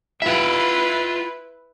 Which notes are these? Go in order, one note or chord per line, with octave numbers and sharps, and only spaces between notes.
E4 F4 B4 E5